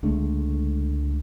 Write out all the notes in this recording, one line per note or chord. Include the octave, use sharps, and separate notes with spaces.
C#2 D3 G#3 A3